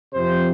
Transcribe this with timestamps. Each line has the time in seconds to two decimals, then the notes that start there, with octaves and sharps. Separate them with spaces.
0.13 F2 C3 F3 C5